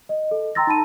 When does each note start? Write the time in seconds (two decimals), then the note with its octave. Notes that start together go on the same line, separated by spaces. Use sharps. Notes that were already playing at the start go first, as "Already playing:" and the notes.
0.09 D#5
0.31 A4
0.55 G5 A#5 C6 E6 A6 A#6
0.67 D#4 A5 B5 D#7